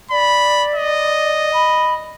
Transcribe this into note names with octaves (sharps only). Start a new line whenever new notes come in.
D5 B5
D#5
B5